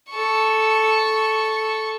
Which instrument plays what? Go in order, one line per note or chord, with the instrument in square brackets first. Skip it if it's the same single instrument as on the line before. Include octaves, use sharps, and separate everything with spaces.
[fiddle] A4 C#6